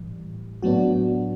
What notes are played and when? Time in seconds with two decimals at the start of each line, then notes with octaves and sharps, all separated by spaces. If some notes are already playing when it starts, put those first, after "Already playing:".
Already playing: A2 E3 G3
0.62 A2 F#3 B3 D4 F#4